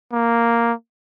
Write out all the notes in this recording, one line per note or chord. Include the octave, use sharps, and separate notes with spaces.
A#3